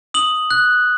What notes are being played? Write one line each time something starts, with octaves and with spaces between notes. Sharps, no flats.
D#6 F#7
F#6